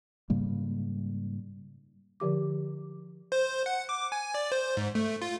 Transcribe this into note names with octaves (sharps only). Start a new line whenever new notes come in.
G#2 C#3 G3 A#3
D3 F3 G4 D6
C5
F#5
D6
G#5
D5
C5
G#2
A3
F4